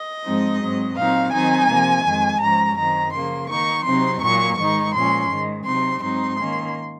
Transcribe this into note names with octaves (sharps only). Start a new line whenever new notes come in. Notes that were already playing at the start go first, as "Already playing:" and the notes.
Already playing: D#5
G#2 F3 G#3 C4 D#4
G#2 F#3 C4
A#2 F#3 C4 D#4 F5
D#3 F#3 C4 D#4 G#5
C3 F3 A#3
F2 D#3 G#3
G#2 F3 G#3 C#4 A#5
F#2 D#3 F#3 C4 A#5
C#3 F3 A#3 C6
D#3 A#3 D#4 C#6
C3 F#3 C4 D#4 C6
A#2 F#3 A#3 C#6
G#2 D#3 G#3 D#4 C#6
A#2 F3 G#3 C#4 C6
G#2 D#3 G#3
C3 F#3 C4 D#4 C6
G#2 F#3 C4 D#4 C6
D#3 A#3 C#4